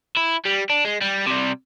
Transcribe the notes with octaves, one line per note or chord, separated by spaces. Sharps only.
E4
G3
D4
G#3
G3
C3 G3